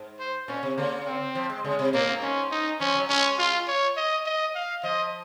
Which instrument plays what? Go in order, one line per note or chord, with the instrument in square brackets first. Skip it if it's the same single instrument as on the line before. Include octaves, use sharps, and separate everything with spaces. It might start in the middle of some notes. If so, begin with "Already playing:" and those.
Already playing: [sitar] G#2
[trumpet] C5
[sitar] A#2 [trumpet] C#4
[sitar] C3
[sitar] C#3 [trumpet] A#3
[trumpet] C4
[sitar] F3
G#3
[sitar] C#3 [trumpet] G#3
[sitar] C3
[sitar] A#2 [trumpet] A#3
[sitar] G#2
[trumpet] C#4
D#4
[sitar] F3 [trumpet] C#4
[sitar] F#3
[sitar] G#3 [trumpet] C#4
[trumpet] F4
C#5
D#5
D#5
F5
[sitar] F3 [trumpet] D#5